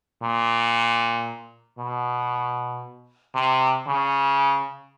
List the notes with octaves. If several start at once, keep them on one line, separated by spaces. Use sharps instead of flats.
A#2
B2
C3
C#3